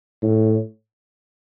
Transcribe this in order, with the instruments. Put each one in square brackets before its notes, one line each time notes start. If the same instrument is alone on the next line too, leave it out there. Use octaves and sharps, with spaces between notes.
[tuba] A2